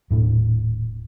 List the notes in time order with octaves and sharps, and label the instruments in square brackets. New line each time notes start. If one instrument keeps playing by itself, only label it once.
[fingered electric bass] D#1 A2 D4